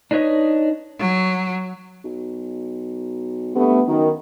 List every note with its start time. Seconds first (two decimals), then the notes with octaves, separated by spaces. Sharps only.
0.11 D4 D#4 B4 C#5 D#5
1.00 F#3
2.04 B1
3.55 G2 A3 B3
3.87 F#2 D#3